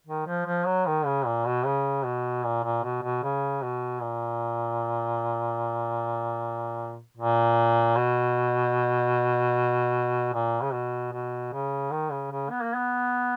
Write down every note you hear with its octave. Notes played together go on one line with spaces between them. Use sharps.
D#3
F3
F3
F#3
D#3
C#3
A#2
B2
C#3
B2
A#2
A#2
B2
B2
C#3
B2
A#2
A#2
B2
A#2
C#3
B2
B2
C#3
D#3
C#3
C#3
B3
A#3
B3